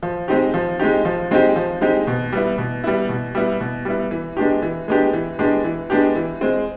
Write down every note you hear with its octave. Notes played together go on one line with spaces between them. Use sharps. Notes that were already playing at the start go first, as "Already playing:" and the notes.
F3
G#3 C4 D#4 G4
F3
G#3 C4 D#4 G4
F3
G#3 C4 D#4 G4
F3
G#3 C4 D#4 G4
B2
G3 B3 E4
B2
G3 B3 E4
B2
G3 B3 E4
B2
G3 B3 E4
E3
G#3 B3 D4 G4
E3
G#3 B3 D4 G4
E3
G#3 B3 D4 G4
E3
G#3 B3 D4 G4
E3
G#3 C4